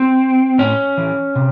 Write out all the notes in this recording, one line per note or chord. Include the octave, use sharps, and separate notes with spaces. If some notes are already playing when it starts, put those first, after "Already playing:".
Already playing: C4
A2 C#4
E3
C3